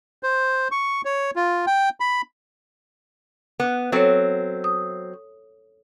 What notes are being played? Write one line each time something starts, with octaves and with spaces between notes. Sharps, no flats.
C5
C#6
C#5
F4
G5
B5
B3
F#3 C4 A4 C#5
D#6